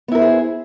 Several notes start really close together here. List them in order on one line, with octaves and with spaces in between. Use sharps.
B3 E4 A#4 C5 G#4